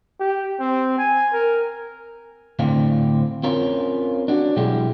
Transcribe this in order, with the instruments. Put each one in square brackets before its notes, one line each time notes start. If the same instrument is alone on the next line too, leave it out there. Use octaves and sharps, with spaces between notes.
[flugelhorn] G4
C4
G#5
A#4
[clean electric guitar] A2 D3 C4 D4 F5
C4 C#4 F4 A#4
D4 F#4
B2 F#3 G#3 E4 G4